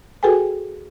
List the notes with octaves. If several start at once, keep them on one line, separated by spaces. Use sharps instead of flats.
F#4 G#4 A4 B4 G5 G#5